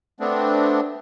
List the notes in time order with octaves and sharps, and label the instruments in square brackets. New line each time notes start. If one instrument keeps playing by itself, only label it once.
[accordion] A3 B3 C4 D4